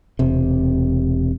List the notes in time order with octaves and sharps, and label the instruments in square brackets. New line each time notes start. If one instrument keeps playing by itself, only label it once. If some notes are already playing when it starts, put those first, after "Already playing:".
[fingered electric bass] E1 C3